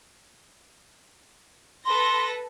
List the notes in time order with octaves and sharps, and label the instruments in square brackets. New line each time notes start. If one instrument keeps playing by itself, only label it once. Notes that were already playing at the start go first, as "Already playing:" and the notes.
[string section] A4 B4 A#6 [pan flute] C6